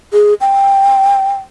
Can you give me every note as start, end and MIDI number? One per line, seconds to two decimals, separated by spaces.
0.13 0.34 68
0.41 1.33 79